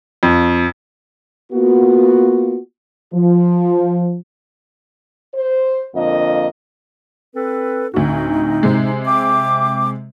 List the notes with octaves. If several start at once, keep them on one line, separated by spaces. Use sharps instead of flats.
F2
A#3 B3 F4 F#4
F3
C5
F2 D3 A#3 D#5
C4 A4 B4
D2 A2 C4 D#4 F#4
C3 G#3
E5 G5 D6